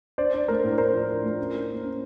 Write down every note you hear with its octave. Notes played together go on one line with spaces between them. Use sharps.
D4 C5 D5
D4
A3 A#4 C5
A2
D4 A#4 C5
F3
D4
A3
C#4
E4
A#3
C#4